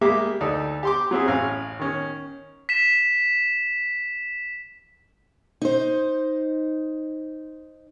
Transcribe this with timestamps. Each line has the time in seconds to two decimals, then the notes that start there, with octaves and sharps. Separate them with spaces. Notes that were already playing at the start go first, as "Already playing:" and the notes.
0.01 G3 G#3 A#3 G4 E5 D6
0.41 D2 D#4 A4 D5
0.83 G4 C6 D6
1.11 F#3 C4 E4 G#4
1.28 A1 C#4 F5
1.79 D#3 C#4
2.69 B6 E7
5.62 D#4 C5